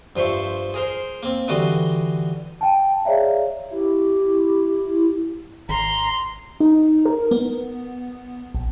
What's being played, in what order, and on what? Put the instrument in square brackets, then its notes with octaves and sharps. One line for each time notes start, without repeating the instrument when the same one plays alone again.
[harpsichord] G2 F3 C5 E5 C#6
G#4 A#4 C5
A#3 C4
D3 E3 G3 F#4 D#5 C6
[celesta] G5 A5
G#4 C#5 D5 E5 F5 A#5
[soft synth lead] E4 [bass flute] G4
[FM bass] G#1 [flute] A#5 [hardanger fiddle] C6
[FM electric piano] D#4
A#4
B3
A#1